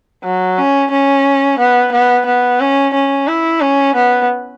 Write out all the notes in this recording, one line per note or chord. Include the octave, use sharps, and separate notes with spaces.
F#3
C#4
C#4
B3
B3
B3
C#4
C#4
E4
C#4
B3